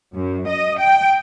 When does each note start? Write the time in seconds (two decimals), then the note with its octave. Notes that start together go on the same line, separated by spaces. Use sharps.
0.15 F#2
0.49 D#5
0.80 G5